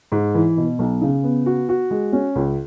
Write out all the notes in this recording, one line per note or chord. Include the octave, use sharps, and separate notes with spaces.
G#2
E3
B2
B1
C#3
B3
F#4
F#4
G#3
C#4
C#2